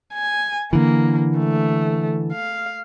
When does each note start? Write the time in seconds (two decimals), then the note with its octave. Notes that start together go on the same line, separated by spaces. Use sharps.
0.14 G#5
0.73 D3 E3 A#3
1.38 A3
2.33 F5